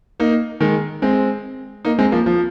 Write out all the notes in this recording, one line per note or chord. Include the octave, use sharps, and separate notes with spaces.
A#3 D#4
D#3 G#3
G#3 C4
A#3 D#4
G#3 C4
F3 A#3
F3